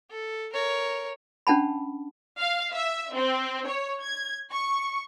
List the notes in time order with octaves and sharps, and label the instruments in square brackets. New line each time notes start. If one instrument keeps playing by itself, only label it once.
[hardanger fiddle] A4
A#4 C#5
[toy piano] C#4 D4 F#5 A5 B5
[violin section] F5
E5
C4
C#5
G#6
C#6